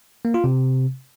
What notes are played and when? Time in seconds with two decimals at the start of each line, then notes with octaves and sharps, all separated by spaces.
0.25 A#3
0.34 F4
0.44 C3